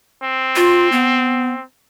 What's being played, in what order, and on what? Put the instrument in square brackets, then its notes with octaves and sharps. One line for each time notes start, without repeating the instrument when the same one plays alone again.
[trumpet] C4
[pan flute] F4
B3